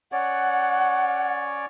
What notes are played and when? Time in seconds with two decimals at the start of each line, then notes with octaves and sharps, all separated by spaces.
0.12 C#4 C#5 D5 F#5